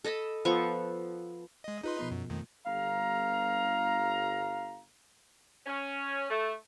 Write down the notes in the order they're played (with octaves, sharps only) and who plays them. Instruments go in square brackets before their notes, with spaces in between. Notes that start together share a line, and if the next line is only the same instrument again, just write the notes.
[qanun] A4 D#5 A5 B5
F3 B3 A4 C#6
[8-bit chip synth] G#3 D#5
[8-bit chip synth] D#4 B4 C6 [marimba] F4 G#4 D#5
[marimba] B2 F3 B3
[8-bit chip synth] F#2
[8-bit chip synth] F2 D#3 [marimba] A3
[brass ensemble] G1 A#5 [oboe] F5
[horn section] C#4
A3